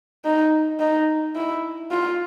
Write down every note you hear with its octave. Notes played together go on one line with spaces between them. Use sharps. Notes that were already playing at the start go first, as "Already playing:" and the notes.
D#4
D#4
E4
F4